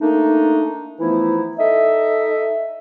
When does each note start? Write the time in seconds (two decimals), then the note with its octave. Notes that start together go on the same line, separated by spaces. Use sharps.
0.01 A3 A#3 D4 D#4
1.00 E3 F3 A3 B3 D#4 E4
1.58 D#4 A4 D#5 E5